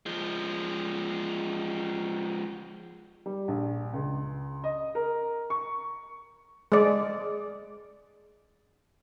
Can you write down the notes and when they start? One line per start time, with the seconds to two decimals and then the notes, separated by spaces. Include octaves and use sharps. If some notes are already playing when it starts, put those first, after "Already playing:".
0.06 F3 G#3
3.26 G3
3.48 A#1
3.93 C#2
4.64 D#5
4.95 A#4
5.50 C#6
6.72 G#3 D5